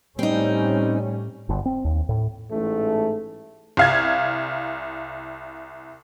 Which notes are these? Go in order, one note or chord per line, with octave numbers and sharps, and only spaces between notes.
A2 G3 C4 C#4 D#4
G1
C4
D#2
A2
A1 G#2 A3
C2 F5 G#6